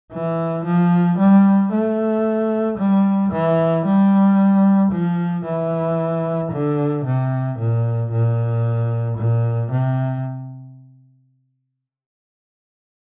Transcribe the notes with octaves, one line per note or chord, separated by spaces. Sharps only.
E3
F3
G3
A3
G3
E3
G3
F3
E3
D3
C3
A#2
A#2
A#2
C3